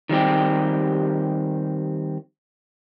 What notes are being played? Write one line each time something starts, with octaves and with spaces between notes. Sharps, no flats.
D#3 G3 C4 G4